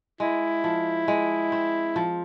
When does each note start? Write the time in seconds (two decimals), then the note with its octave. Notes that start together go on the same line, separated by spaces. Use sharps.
0.20 G#3 E4
0.64 F3
1.08 G#3
1.52 C4
1.96 F3